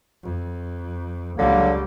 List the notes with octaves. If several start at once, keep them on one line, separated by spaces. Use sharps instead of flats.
F2
C#2 D3 F#3 G3 A#3